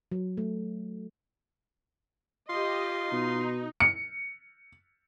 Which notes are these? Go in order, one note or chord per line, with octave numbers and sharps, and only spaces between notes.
F#3
A3
F4 G4 D#5 C6
B2 D#4
C#7